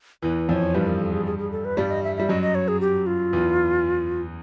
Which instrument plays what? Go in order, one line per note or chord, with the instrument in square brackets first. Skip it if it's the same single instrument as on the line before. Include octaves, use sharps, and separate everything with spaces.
[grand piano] E2 E3 [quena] B4
[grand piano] F2 F3 [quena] C#5 D5
[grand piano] G2 G3 [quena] B4
[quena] A#4
A4
G#4
G#4
G#4
A4
B4
[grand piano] G2 G3 [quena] D5
[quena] D#5
E5
[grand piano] G3 [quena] E5
[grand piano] F#2 F#3 [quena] D#5
[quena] D#5
C#5
G#4
G4
F4
[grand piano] E2 E3